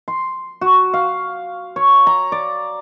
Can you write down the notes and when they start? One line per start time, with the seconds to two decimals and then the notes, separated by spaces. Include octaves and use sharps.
0.08 C6
0.61 F#4
0.94 F5
1.76 C#5
2.07 A#5
2.32 D5